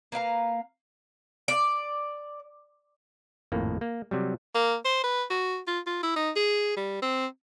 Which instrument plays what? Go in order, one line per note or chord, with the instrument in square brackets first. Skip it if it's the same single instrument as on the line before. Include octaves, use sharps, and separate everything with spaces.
[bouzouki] A#3 B4 F5 A#5
D5
[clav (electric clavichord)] G#1 F2 A2 A#3
A#3
C3 F#3 G3
[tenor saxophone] A#3
C5
B4
F#4
F4
F4
E4
D#4
G#4
G3
C4